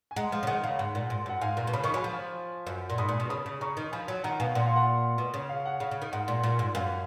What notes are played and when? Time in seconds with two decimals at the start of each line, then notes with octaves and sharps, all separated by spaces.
0.11 G#5
0.16 G#3 F#5 A#5
0.32 F3
0.43 C#3
0.47 D#3 F#5
0.63 C#3 F5
0.79 G#2 F#5
0.95 A#2
1.10 G#2
1.26 F#2 F#5
1.41 G#2 F5 G#5
1.57 A#2
1.67 B2
1.73 C#3 B5
1.84 D#3 C#6
1.94 F#3 G#5 B5
2.04 F3
2.67 F#2
2.90 A#2
2.98 G#2 B5 D#6
3.09 A#2
3.20 B2
3.29 C#3 B5 D#6
3.46 C#3
3.61 C#3 A#5 C#6
3.77 D#3
3.92 F3 G#5 B5
4.08 F#3
4.24 D#3 F#5 A#5
4.40 B2 F5 G#5
4.55 A#2 F#5
4.66 F5
4.76 F#5
5.18 B2
5.34 C#3
5.49 F5
5.65 F#5
5.80 C#3 F5
5.91 C#3
6.02 D#3
6.12 G#2 F#5
6.28 A#2
6.44 A#2
6.59 G#2
6.75 F#2 F5 G#5